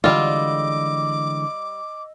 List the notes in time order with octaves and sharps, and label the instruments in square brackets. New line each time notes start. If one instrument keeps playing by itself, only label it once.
[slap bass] D3 E3 G#3 [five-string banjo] G3 F4 [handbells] D#5 E6 [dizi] D6